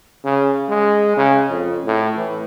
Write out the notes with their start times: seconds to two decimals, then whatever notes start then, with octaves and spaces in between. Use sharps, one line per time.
0.24 C#3
0.68 G#3
1.17 C#3
1.50 F2
1.84 A2
2.16 E3